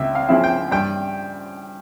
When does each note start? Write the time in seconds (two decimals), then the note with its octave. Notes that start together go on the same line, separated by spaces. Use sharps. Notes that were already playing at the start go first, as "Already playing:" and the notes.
Already playing: C#2 E5
0.15 F5
0.29 C#3 F3 C4 E4
0.44 G5
0.72 G2 G5